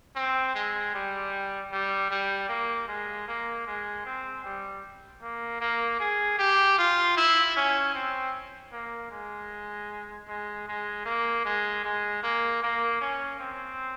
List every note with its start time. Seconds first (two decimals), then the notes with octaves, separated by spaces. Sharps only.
0.16 C4
0.55 G#3
0.94 G3
1.72 G3
2.11 G3
2.49 A#3
2.88 G#3
3.28 A#3
3.66 G#3
4.05 C4
4.45 G3
5.22 A#3
5.60 A#3
6.00 G#4
6.39 G4
6.78 F4
7.17 E4
7.56 C#4
7.95 C4
8.72 A#3
9.11 G#3
10.28 G#3
10.68 G#3
11.06 A#3
11.45 G#3
11.85 G#3
12.23 A#3
12.62 A#3
13.01 C#4
13.39 C4